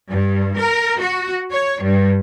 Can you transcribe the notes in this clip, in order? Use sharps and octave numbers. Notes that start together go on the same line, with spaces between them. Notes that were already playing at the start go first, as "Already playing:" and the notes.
G2
A#4
F#4
C#5
G2